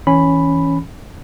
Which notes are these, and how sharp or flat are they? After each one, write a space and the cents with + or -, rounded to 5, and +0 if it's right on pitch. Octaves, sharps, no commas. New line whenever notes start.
E3 -15 C#4 +0 B5 +0